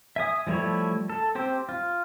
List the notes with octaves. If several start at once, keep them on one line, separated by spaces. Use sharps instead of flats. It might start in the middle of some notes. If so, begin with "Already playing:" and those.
E5 G#5 D#6
F3 G3 A3 E4 C#5
A4
C4 G4 C5
F4